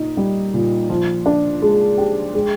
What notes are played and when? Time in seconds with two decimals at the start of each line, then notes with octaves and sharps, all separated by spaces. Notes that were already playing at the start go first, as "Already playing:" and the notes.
Already playing: A#2 D#4
0.17 G3
0.54 A#2
0.89 F3
1.26 D4
1.62 G#3
1.98 G4
2.34 G#3